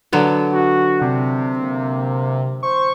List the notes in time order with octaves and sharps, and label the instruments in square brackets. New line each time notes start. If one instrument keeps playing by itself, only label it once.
[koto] D3 F#3 B3
[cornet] F#4
[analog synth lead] C3 [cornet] D4
[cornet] A#3
[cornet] C5 [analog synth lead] C#6